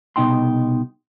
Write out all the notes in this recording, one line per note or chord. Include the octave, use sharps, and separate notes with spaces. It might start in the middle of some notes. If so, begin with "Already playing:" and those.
C2 B2 D#4 G5 C6